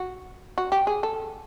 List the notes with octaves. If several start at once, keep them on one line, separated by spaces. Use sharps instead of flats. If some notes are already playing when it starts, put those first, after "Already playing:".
Already playing: F#4
F#4
G4
G#4
A4